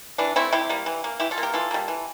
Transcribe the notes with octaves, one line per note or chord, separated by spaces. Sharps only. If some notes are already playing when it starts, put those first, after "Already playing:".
E3 D4
A3 C4 E4
C3 E4 G4
G3 A#3
E3
A#3
E3 E4 G4
F4 A4
A#3
G4 A#4
E3 F4 A4
G3 A#3
E3